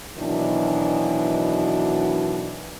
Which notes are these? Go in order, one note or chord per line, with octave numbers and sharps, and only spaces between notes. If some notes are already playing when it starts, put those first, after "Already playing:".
B2 D#3 E3 F#3 D4